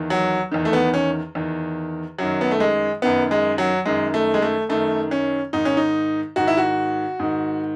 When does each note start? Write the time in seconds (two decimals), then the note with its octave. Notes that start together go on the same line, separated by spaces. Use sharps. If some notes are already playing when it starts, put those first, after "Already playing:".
Already playing: E2 D#3
0.10 F#3
0.51 E2 D#3
0.65 A3
0.73 B3
0.94 C#4
1.35 E2 D#3
2.19 F#2 D#3 F#3
2.41 B3
2.51 A3
2.60 G#3
3.02 F#2 D#3 B3
3.31 G#3
3.58 F#3
3.86 F#2 D#3 G#3
4.14 A3
4.34 G#3
4.42 A3
4.69 F#2 D#3 A3
5.11 C#4
5.53 G#2 D#3 D#4
5.65 C#4
5.77 D#4
6.36 G#2 D#3 F#4
6.48 E4
6.57 F#4
7.20 G#2 D#3